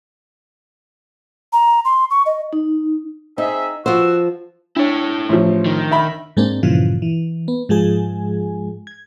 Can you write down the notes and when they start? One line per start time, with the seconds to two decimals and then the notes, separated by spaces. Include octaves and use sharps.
1.53 A#5
1.85 C6
2.10 C#6
2.26 D#5
2.53 D#4
3.38 C4 D#4 G#4 E5
3.86 F3 F#4 C5 E6
4.76 D4 E4 C#5
5.29 A1 F3
5.66 D#3
5.91 E5 B5
6.37 G#2 G#3 A#3 C4 D4
6.63 G2 A#2 C#3 E3 F3 F4
7.02 E3
7.48 B3
7.69 G#2 F3 G#3 G#4 G#5
8.87 G#6